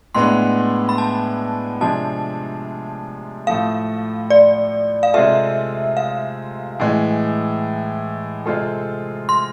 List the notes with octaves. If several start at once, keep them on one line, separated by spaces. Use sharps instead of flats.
A2 G#3 B3 D4 C6
B5
A5
C3 F3 G#3 D4 A5
A2 F3 A3 F5
D5
F5
C3 G#3 C4 F4 A4 E5
F5
A2 E3 G#3
C3 G#3 C4 F4 A4
C6